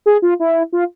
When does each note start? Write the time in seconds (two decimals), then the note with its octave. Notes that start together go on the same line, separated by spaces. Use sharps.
0.06 G#4
0.22 F4
0.40 E4
0.73 F4